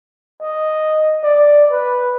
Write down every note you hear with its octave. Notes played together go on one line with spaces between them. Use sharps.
D#5
D5
B4